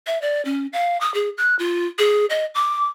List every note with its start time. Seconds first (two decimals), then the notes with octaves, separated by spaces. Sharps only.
0.07 E5
0.22 D5
0.45 C#4
0.73 F5
1.01 D#6
1.14 G#4
1.38 F#6
1.59 F4
1.99 G#4
2.30 D#5
2.55 D6